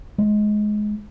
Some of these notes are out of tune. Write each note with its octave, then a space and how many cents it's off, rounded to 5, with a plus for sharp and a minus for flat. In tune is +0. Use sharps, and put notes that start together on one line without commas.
G#3 +15